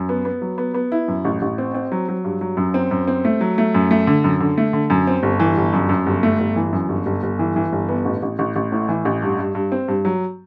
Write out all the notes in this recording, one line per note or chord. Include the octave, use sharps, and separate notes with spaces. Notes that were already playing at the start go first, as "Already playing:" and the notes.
Already playing: F#2
B3
B3
F#3
B3
B3
E4
F#2
A1
A1
C4
C4
F#3
F#3
G2
F#3
F#2
C4
F#2
C4
A3
F#3
A3
F#2
A3
D3
F#2
D3
A3
D3
F#2
C4
G1
E3
G1
F#2
F#2
G1
A3
G1
E3
F#2
G1
G1
G1
E3
E3
G1
B3
A1
A1
A1
A1
A2
E3
A1
G2
G2
G2
C4
G2
F#3